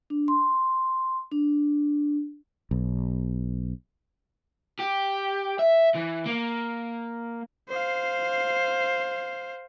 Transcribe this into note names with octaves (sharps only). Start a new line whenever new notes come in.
D4
C6
D4
B1
G4
E5
E3
A#3
C5 F5